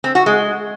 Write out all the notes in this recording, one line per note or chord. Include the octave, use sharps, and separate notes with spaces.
C4
F#4
G#3